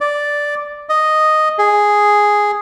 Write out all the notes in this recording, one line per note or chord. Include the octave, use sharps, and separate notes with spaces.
D5
D#5
G#4